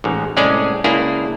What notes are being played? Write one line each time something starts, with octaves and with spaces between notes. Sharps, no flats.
A1 G#2
C2 A2 G#3 C#4 G#4 D5
C#2 A#3 D4 E4 G#4